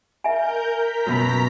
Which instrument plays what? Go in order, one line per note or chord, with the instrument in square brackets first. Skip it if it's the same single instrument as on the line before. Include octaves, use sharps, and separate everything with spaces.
[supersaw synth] A#4 G6 [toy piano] E5 G#5
[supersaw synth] A#5 B6
[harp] F#2 B2 B5